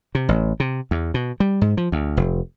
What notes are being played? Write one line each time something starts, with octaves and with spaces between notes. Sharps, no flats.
C3
A1
C3
E2
B2
G3
G#2
F3
D2
F1